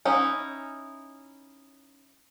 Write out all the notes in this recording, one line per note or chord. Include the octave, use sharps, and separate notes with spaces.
C#4 D#4 E4